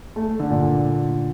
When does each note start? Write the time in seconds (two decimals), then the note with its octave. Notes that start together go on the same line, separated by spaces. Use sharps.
0.16 A3
0.40 D3
0.50 A#2